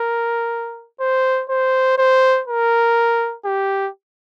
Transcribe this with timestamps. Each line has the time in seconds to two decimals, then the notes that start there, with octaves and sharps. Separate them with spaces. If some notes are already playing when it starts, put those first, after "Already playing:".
Already playing: A#4
1.00 C5
1.49 C5
1.98 C5
2.48 A#4
3.45 G4